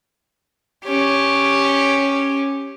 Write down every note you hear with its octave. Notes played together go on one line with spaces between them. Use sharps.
C#4 G4